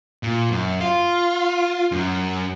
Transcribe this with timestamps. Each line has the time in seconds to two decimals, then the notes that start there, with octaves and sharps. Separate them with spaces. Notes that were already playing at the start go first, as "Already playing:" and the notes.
0.23 A#2
0.49 F#2
0.80 F4
1.92 F#2